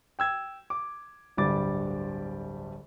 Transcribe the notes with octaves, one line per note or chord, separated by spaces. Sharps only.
G5 E6 G#6
D6
D1 G1 G2 G3 D6 A6